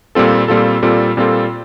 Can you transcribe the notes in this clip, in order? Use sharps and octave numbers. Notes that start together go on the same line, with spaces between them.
A#2 G3 C4 F4 A4
A#2 G3 C4 F4 A4
A#2 G3 C4 F4 A4
A#2 G3 C4 F4 A4